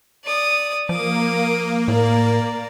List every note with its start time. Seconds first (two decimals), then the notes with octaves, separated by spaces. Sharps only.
0.25 D5 D#6
0.89 F3 A#3 D6 D#6
1.88 A2 D5 A#5